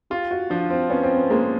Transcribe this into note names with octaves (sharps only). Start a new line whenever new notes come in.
F4 G4
F#4
F3 D4
C4
B3 C#4
C4
B3
G#3 A#3